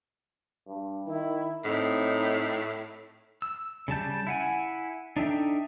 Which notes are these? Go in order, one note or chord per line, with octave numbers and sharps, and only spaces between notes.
G2
D#3 E4
A2 C4 D#4
E6
C#3 G3 A5 G6
E4 F#5 G#5
D4 D#4 A4 E5 G5